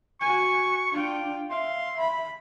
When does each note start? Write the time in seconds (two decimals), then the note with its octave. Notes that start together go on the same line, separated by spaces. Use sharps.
0.21 F#4 G#5 C#6
0.92 D4 F4 G5
1.50 E5 F5 C6
1.98 B5